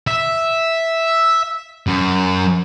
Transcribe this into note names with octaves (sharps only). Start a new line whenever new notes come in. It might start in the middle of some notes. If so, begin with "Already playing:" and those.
E5
F#2